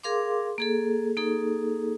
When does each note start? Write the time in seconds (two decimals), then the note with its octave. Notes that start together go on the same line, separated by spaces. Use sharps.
0.04 G#4 A#4 F5 C6 D6
0.58 A#3 G#4 A4
1.17 A#3 D#4 G#4 A4